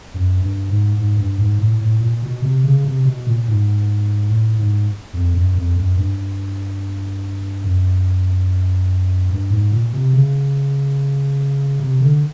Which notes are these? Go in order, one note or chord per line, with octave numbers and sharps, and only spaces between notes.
F#2
G2
G#2
G#2
G2
G#2
A2
A2
A#2
B2
C3
C#3
C3
B2
A#2
G#2
A2
G#2
F2
F#2
F2
F#2
G2
F#2
G2
G#2
A#2
C3
C#3
C3
D3